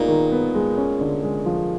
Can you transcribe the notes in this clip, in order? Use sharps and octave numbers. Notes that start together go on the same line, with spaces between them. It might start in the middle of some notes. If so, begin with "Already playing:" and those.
Already playing: A#2 G#3 B3 D#4
D#3
B3
G#3
C#4
D3
G#3
F3